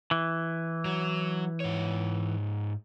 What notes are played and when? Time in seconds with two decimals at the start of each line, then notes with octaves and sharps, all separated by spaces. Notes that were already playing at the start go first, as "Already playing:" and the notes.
0.11 E3
0.85 F#3
1.60 G#2 C#5